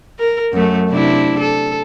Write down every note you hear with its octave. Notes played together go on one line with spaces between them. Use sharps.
A#4
F#2 A3
C3 D4 E4
A4